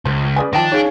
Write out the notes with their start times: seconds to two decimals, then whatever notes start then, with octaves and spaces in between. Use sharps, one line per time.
0.05 C#2 F3 C5
0.36 C#3 G#4 B4 D5 G#5
0.53 D#3 F3 D4 D#5 G5 A5
0.72 D#4 G#4 C#5 F5 G#5